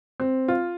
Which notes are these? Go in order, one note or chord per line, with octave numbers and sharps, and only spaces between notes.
C4
F4